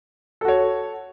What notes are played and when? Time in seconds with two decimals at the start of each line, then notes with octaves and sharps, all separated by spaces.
0.41 A4
0.45 F#4
0.48 C#5